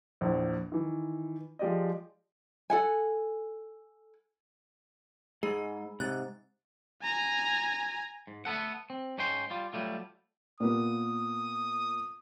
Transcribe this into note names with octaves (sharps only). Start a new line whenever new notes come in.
A#1 E2
D#3 E3
F3 G#3 G4 D5 D#5
A4 F#5 G#5
G#2 G#3 G#4 B5
G#2 C3 F#6 A6
G#5 A#5
G#2
A3 B3 A4 F#5
C4
G#2 C#4 D#4 G5 C6
G3 F4
F#3 G3 A3 F4
A#2 A#3 B3 D#6